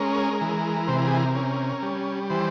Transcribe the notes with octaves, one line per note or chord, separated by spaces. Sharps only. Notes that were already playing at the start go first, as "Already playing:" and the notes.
Already playing: G#3 C#4 A#4
E3
C3 C5
A#4
G#4
A#4
C#4
G3
E3 C5